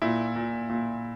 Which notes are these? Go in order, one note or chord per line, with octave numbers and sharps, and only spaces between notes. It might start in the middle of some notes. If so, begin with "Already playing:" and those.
A#2 E4
A#2
A#2